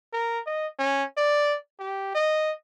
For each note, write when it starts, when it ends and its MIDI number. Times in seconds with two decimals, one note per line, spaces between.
0.14 0.40 70
0.47 0.67 75
0.79 1.04 61
1.17 1.56 74
1.80 2.13 67
2.15 2.52 75